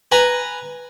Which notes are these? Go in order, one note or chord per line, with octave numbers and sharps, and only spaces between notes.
B4 G#5 A#5